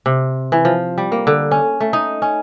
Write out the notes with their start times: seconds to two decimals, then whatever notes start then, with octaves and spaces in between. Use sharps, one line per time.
0.06 C3
0.52 E3
0.65 F3
0.98 G3
1.12 A#3
1.27 D3
1.51 C#4
1.80 A3
1.93 D#4
2.22 C#4